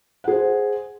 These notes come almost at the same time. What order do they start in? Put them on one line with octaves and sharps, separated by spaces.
F#5 G#4 C5